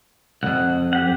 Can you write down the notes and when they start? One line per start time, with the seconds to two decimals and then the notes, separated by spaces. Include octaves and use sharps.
0.43 C2 F2 F#5
0.93 G4 F#5